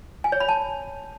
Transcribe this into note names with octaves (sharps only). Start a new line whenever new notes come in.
G#5
C#5
B5
A5